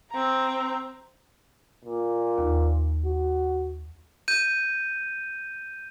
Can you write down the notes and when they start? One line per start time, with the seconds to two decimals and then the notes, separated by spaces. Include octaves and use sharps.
0.10 C4 A#5
1.84 A#2
2.38 D#2
3.05 F#4
4.28 G6 D#7